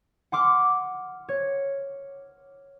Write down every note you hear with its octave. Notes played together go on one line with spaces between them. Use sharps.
F#5 C6 D6 F6
C#5